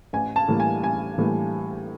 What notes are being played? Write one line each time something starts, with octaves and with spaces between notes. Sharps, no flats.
A1 G#5
A5
A2 E3 G3 A#3
G#5
A1 G#5
A2 E3 G3 A#3